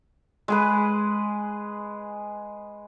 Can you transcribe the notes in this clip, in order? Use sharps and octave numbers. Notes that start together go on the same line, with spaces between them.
G#3 G#4 B4